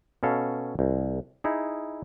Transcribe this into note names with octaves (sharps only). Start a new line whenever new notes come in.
B2 C#4 A4 F5
C2
D#4 E4 G#4